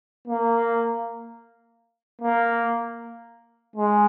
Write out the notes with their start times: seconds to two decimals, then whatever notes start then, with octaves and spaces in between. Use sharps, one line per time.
0.28 A#3
2.21 A#3
3.76 G#3